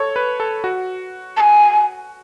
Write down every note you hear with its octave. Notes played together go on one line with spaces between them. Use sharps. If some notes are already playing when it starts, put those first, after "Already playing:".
Already playing: A4 C#5
B4
A4
F#4
A5
G#5